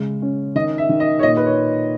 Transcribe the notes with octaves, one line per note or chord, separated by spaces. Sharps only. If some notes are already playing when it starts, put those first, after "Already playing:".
Already playing: C#3 G#3
C#4
D#3 D#5
E5
D#3
D#5
C#5
A#2 D#5
B4
C#5